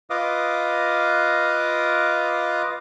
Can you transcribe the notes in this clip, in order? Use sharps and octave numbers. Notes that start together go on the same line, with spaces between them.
F4 B4 D#5 F5 D6 D#6